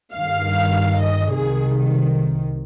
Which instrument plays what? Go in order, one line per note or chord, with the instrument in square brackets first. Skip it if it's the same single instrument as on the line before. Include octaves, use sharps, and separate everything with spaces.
[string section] G2 D#3 F5
D#5
C2 C3 D#3 G#4